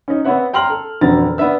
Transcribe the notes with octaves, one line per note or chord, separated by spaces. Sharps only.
C#4 D#4
B3 C4 C#5 E5 F#5
G5 A#5 C6 F6 F#7
A4
E1 F2 D3 F#4 A#5 A6
B3 D4 E5 E6